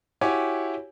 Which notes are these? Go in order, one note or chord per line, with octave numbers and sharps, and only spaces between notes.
E4 F#4 G4 C#5 G#5 D6